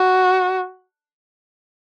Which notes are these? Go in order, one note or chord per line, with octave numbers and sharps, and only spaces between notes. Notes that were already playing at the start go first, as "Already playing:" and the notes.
Already playing: F#4